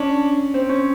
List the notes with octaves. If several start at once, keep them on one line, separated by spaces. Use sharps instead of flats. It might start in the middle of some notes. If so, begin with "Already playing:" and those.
Already playing: C#4 D4
C4
C#4